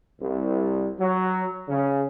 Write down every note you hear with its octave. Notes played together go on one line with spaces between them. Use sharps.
C2
F#3
C#3